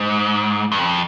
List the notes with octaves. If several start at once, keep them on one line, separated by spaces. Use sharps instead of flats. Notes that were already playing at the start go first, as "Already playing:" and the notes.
Already playing: G#2
G2
F2